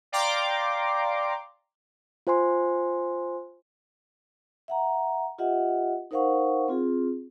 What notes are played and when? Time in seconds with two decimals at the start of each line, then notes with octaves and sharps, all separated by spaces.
0.12 D5 F5 G5 A#5 C6 D6
2.27 F4 C5 G#5 C6
4.68 E5 F#5 A#5
5.38 F4 G4 D#5 E5 F#5
6.11 D#4 A#4 C5 F5 F#5 C#6
6.68 C4 F4 G#4